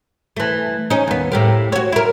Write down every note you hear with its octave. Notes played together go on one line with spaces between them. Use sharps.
E3 A3
C#4 D#4
D#2 B3
A2 G4 A#4
F#4 C#5
E4 A#4